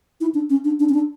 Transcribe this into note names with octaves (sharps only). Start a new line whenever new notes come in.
E4
D4
C#4
D4
D4
C#4
D4